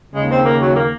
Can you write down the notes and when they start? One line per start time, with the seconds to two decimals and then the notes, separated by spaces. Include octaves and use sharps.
0.14 D#2 C#3 G#3
0.31 C4
0.45 A#3
0.61 F#3
0.76 A#3